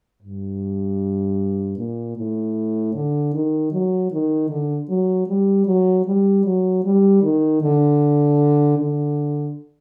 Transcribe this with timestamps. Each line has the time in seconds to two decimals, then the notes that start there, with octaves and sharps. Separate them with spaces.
0.22 G2
1.78 A#2
2.17 A2
2.94 D3
3.34 D#3
3.72 F#3
4.12 D#3
4.50 D3
4.89 F#3
5.28 G3
5.67 F#3
6.06 G3
6.45 F#3
6.84 G3
7.22 D#3
7.62 D3
8.78 D3